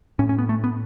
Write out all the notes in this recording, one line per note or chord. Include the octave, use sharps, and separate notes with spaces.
A2 C#4
C#4
B3
A3
B3